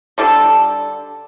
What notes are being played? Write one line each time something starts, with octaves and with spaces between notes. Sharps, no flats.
D3 G3 A4